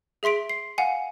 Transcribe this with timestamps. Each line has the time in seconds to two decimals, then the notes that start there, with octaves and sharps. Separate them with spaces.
0.23 G#4 E5 C6 B6 D7
0.50 C7
0.78 F5 F#5 G#5